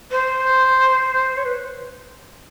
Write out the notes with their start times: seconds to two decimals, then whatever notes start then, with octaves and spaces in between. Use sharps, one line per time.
0.11 C5
1.37 C#5
1.45 B4